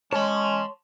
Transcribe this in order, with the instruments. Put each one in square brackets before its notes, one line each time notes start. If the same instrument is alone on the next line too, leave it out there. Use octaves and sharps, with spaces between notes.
[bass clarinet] G#3 [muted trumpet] C#4 [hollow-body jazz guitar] C#5 [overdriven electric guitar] A5 C6